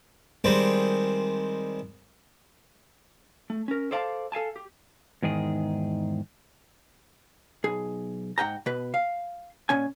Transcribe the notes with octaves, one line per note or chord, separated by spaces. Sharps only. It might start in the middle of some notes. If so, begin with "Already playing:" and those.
D#3 G3 G#3 C4
A3
C#4 A#4
A4 C5 D5 F5 G#5 A5
A4 F5 G#5 A5
G4
E2 G#2 D#3 G#4
B1 G#4
G#2 F#5 G5 A#5
B2 B4
F5
A#2 C#4 G#5